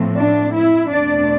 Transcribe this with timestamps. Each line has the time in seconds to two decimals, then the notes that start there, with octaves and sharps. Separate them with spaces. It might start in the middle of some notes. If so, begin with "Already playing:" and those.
Already playing: A2 F3 A3 C4
0.16 D4
0.54 E4
0.90 E2 B2 A3 C4 D4 D5